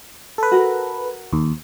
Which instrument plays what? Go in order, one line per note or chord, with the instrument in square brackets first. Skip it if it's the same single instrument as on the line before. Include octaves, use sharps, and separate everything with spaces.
[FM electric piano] A4 B4
[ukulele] F#4 A#4
[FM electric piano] D#2